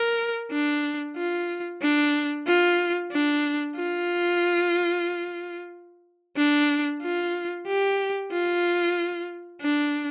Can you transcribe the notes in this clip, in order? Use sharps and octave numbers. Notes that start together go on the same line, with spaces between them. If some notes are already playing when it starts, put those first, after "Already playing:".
Already playing: A#4
D4
F4
D4
F4
D4
F4
D4
F4
G4
F4
D4